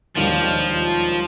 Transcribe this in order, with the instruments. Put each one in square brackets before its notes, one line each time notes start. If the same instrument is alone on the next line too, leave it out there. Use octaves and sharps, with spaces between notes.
[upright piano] E1 D#2 D#3 G3 [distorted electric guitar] F3